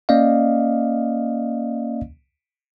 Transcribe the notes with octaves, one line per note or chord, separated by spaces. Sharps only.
A#3 C#4 D5 D#5 F5